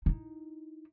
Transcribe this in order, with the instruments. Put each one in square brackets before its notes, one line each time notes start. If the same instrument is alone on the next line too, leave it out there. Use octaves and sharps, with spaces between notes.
[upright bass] D#4 E4